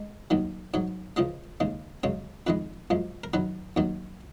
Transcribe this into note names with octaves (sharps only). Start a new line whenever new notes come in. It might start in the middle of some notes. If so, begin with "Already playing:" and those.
Already playing: G#3
D#2 D#3 F#3
G#2 F#3 C#5
C#2 C#3 F3 G#3 D#5
D#2 C#3 G#3
F#2 C#3 G#3 C#5
F2 D#3 G#3 B4
F#2 F3 G#3
A#4
F#2 D#3 F#3 B4
D#2 D#3 F#3